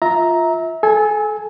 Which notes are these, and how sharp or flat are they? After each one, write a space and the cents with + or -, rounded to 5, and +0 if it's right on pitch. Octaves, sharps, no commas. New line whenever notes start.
F4 +0 E5 -25 A#5 +5
A4 -30 G#5 +0